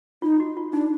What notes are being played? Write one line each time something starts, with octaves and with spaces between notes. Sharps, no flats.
D#4 F4
F#4
F4
D4 D#4